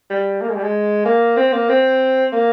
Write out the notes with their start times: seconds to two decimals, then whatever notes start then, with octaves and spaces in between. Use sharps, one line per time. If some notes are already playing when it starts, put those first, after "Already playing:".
0.10 G3
0.42 A#3
0.49 G#3
0.56 G3
0.64 G#3
1.05 A#3
1.37 C4
1.53 A#3
1.69 C4
2.32 A#3